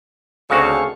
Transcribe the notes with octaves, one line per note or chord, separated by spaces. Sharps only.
D2 C#3 C4 F#4 G#4 A4 F5 C#6